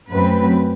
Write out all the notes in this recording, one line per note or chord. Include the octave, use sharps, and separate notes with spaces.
F#2 F#3 A3 C4 B4